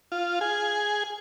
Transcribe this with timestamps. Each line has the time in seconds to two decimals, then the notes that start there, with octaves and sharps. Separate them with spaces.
0.12 F4
0.41 G#4